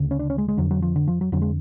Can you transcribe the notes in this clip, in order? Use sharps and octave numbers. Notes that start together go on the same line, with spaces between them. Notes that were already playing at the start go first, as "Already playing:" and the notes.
Already playing: D2 C#3
C#4
D4
C#4
G#3
G#3
F2 D3 F#3
F#3
F3
D3
F3
F#3
F2 D3 F#3
G#3